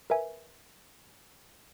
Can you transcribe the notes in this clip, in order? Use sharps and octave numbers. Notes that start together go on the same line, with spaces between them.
A#4 B4 E5 G#5